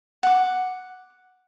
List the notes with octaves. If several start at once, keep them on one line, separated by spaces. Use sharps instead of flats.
F#5 D6